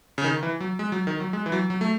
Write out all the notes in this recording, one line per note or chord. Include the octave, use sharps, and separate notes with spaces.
C#3
D#3
E3
F#3
G#3
F#3
D#3
F#3
G#3
E3
F#3
F#3
A3